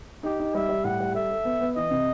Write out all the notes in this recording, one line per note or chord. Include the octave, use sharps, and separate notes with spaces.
D#4 G4
D#4
G3 E5
G3
A2 F#5
G3
A4 E5
A4
B3
B3
E3 D#5
C3